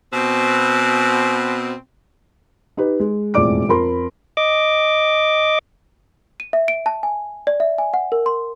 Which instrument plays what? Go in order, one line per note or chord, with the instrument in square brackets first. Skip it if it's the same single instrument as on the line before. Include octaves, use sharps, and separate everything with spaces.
[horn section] B2 C4
[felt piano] D#4 G4 B4
G#3
E1 F2 A2 D5 D6 D7
F2 A#4 B5 C6
[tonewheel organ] D#5 D6
[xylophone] D#7
E5
D7
A5
G#5
D5
E5
G#5
F#5
A#4
C6